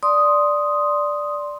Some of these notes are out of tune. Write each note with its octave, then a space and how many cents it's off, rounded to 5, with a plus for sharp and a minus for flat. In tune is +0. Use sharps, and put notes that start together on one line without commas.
D5 +0 C6 +0 D#6 +0